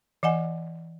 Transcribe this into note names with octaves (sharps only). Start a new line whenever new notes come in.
E3 D#5 F#5 G#5